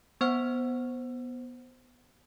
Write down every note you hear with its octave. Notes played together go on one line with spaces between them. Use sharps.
B3 C5 F#5 F6